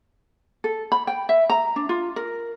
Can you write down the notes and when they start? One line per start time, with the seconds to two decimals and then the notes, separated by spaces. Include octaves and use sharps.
0.64 A4
0.92 B5
1.07 G5
1.29 E5
1.50 A#5
1.76 D4
1.89 F4
2.16 A#4